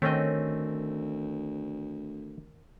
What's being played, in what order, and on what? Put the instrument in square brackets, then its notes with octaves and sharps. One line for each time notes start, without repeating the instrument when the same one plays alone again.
[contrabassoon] D2 [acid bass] D#3 [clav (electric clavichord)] A3 C4 D#5 [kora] C#4 G5